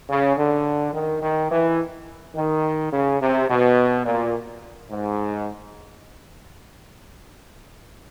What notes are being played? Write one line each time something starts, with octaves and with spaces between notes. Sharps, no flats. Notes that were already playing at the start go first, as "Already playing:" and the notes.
C#3
D3
D#3
D#3
E3
D#3
C#3
C3
B2
A#2
G#2